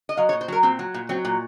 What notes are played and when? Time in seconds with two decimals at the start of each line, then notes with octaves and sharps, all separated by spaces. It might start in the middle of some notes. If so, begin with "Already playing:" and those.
0.09 D#5
0.17 F#3 F5
0.29 C#5
0.33 A#2
0.41 C5
0.48 F#3 A#4
0.63 A#2 C4
0.79 F#3
0.94 A#2
1.09 F#3 C4
1.25 A#2